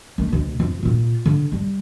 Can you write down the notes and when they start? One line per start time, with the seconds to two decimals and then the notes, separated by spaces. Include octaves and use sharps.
0.18 D#3 A3
0.31 D2 B2
0.60 F2
0.83 A#2 F4
1.26 D3
1.52 G3